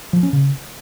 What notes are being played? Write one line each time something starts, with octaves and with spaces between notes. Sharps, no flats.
F3
C#4
C#3